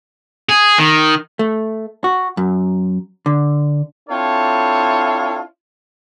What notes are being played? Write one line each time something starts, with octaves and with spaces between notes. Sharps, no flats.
G#4
D#3
A3
F#4
F#2
D3
C4 D4 E4 F4 A4 C#5